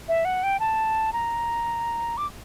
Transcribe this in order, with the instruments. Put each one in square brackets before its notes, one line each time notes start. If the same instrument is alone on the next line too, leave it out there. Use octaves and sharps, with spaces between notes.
[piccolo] E5
F#5
G5
A5
A#5
D6